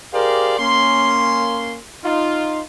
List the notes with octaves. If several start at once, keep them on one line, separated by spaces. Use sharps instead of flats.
G4 G#4 A#4 C5 D5 F5
A#3 C#4 C6
D#4 F4